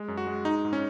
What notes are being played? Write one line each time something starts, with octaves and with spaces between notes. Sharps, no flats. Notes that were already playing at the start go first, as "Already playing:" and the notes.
Already playing: G#3
F#2
F#4
G#3
G#3 D#4
G#2
C#4